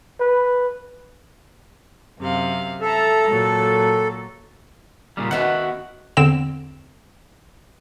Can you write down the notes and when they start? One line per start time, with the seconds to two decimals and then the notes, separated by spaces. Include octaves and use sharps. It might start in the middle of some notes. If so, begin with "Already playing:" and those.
0.20 B4
2.18 F#2 C3 F5
2.81 A4 E5 A5 A#5
3.26 A#2 F#3
5.17 A#2 C#3 G3
5.31 D#3 B3 C#4 F#4 E5 F#5
6.17 E2 D3 C4 G5 E7